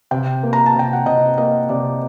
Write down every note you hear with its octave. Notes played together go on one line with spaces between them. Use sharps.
C3 G5
A#3
A#5
A5
C3 G5
F#5
C3 D#5
A#3 D#5
C3 D5